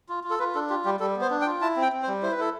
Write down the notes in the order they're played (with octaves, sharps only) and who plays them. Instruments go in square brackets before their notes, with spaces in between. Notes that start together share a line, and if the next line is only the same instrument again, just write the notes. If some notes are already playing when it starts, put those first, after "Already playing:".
[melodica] F4
F4
A4
F4 B4
D4 A4
F4 G4
G3 G4
G3 A4
B3 C5
D4
G5
F4
E4 A5
C4
G5
C4
C5
G3
E4 C5
B4
E4 A4